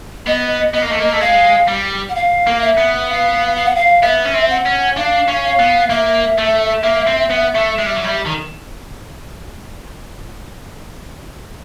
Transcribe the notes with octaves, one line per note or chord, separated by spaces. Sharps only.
B3 D#5
B3 D#5
A#3
A3
A#3
A3
G#3 F5
G3
F#5
F5
A#3
E5
B3
F5
F5
F#5
F5
B3 E5
C#4
C4
F#5
C#4
D4 F5
C#4
F5
B3
A#3 E5
A3
A#3
C4
B3
A3
G#3
G3
F#3
G3
D#3